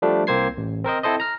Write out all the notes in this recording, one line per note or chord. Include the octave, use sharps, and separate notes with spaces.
F3 G3 A3 D4
C2 A#3 C4 C5 G#6 C7
A1
C4 A#4 C5 D#5
C4 E4 A4 C5 D#5
A#5 F6